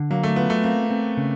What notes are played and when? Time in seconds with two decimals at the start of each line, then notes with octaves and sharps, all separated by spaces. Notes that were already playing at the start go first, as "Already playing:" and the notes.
Already playing: D3
0.11 F#3 A#3
0.23 A3
0.36 B3 F4
0.50 A3
0.64 A#3 C4
0.90 C4
1.17 C#3